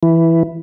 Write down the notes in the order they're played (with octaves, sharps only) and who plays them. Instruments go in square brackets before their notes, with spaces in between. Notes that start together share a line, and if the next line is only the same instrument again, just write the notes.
[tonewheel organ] E3